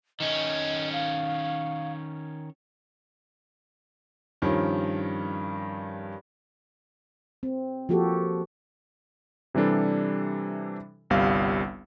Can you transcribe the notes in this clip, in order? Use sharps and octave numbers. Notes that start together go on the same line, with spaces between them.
D#3 C#4 D#5
F5
G2 D#3 F3 C#4
C4
F3 A#3 F#4 G4 A4
C3 E3 G3 D4 A4
G1 C2 G3 F5